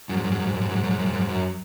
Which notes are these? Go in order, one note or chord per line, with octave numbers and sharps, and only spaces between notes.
F#2
G#2
F#2
G#2
F#2
G#2
F#2
G#2
F#2
G#2
F#2
G#2
F#2
G#2
F#2
G#2
F#2